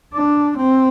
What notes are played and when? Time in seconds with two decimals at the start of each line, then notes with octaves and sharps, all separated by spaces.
0.14 D4
0.58 C4